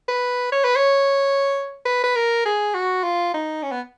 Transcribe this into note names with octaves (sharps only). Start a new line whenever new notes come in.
B4
C#5
B4
C#5
B4
B4
A#4
G#4
F#4
F4
D#4
C#4
B3